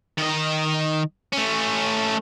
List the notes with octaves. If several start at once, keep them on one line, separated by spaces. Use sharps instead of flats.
D#3 D#5
A3 C#4